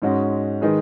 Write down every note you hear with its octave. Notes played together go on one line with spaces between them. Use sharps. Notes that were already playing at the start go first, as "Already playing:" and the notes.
G#2 G#3 C#4 F#4
D#3 G#3 D#4 G#4 B4